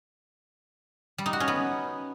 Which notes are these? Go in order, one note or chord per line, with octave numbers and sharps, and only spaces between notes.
G3
D#4
F#4
C#4
B3